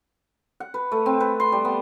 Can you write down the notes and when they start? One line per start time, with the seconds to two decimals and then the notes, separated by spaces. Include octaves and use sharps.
0.60 F#5
0.74 B4
0.92 A3
1.06 C4
1.20 B4
1.40 C6
1.52 G3
1.65 B3